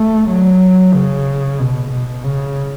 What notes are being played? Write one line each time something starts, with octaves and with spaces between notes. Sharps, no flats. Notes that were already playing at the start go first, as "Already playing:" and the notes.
Already playing: A3
F#3
C#3
B2
B2
C#3